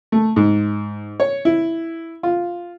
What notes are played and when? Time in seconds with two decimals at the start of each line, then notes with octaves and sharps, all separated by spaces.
0.12 A3
0.36 G#2
1.20 C#5
1.45 E4
2.23 F4